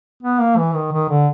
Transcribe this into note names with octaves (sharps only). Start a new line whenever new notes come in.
B3
A#3
E3
D#3
D#3
D3